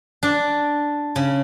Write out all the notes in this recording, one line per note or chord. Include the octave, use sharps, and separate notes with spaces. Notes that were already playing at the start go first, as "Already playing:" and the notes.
D4
C#3